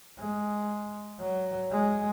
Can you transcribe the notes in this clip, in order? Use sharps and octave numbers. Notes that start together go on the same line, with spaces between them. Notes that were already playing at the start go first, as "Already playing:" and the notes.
G#3
F#3
G#3